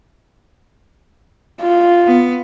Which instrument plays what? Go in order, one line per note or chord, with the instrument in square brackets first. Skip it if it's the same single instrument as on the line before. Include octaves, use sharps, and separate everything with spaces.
[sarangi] F4
[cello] B3